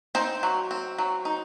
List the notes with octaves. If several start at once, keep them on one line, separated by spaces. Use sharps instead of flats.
C4 D#4 C5
F#3
C4
F#3
D#4